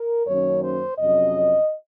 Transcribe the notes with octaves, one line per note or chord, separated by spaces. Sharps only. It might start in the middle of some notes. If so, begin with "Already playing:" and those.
Already playing: A#4
F#2 D#3 F#3 A#3 C#4 C#5
C5
F2 C3 F#3 C#4 D#5